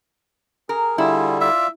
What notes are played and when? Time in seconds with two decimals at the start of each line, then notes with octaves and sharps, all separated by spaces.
0.69 G#4 A#4
0.98 D3 G3 E4 F4 G#4
1.41 F4 D5 E5 F5